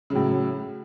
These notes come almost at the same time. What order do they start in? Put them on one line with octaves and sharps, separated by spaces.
C#3 F#3 A2